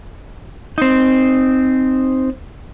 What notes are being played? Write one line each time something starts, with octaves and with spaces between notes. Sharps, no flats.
C4 D#4